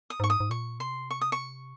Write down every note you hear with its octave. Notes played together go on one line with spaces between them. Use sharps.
D#6
G#2 C#6
D#6
G#2
A#2 C#6
C3 C6
C#6
D#6
C#6